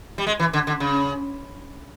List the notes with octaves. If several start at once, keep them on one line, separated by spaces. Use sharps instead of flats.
G3
G#3
E3
D3
D3
C#3